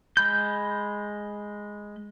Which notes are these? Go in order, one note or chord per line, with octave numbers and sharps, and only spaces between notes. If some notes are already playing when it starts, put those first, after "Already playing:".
G#3 B5 G6